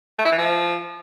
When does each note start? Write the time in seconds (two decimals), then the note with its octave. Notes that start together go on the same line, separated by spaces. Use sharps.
0.19 A3
0.25 E4
0.32 E3
0.38 F3